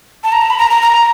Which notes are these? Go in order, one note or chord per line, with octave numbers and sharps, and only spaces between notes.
A5
A#5
A5
B5
A#5
A#5
A#5